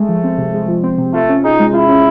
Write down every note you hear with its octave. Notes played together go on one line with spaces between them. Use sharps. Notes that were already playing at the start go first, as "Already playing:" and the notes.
Already playing: G#3 A3
F3
C4
C3
G#3
F3
C4
C3
A3 F4
C#4
D#4 G#4
G#3
E4 F4
C#4